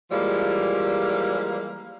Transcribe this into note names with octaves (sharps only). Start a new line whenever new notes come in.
E3 F3 G3 G#3 A#3